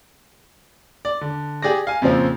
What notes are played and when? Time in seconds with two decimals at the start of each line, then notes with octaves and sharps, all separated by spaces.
1.05 D5
1.21 D3
1.63 G4 G#4 D5 A#6
1.87 F5 G#5
2.02 F2 A#2 C#3 F3 C4